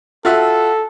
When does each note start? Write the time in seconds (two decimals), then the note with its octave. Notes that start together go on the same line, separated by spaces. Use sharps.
0.25 F4 F#4 A4 E5